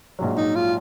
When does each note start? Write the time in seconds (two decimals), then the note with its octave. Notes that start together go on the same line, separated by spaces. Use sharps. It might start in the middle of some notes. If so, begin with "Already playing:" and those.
0.19 A#1 G#2 F#3
0.37 D#4
0.55 F4